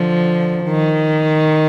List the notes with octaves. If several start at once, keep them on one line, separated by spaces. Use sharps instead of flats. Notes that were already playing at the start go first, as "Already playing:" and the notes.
Already playing: D3 F3
D#3